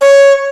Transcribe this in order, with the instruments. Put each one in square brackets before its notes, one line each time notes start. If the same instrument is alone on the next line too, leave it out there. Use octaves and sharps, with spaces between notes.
[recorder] C#5